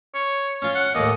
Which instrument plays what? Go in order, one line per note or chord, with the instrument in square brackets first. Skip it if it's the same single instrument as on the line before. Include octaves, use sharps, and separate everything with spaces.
[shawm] C#5
[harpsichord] C#4 F4
[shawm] F#5
[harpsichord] D#2 A2 [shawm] D#5